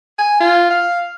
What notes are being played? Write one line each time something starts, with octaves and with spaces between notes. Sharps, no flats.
G#5
F4
F5